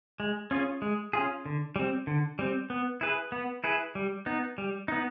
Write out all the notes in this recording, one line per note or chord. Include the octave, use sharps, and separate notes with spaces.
G#3
C#4 F4 G#4
G#3
C#4 F4 G#4
D3
G3 C4
D3
G3 C4
B3
E4 G#4 B4
B3
E4 G#4 B4
G3
B3 D#4
G3
B3 D#4